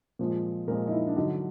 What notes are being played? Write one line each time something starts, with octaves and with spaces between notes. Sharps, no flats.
A#2 F3 G#3
A#2 F3 G#3 A#4
D#4
E4
D4
D3 F#3 D#4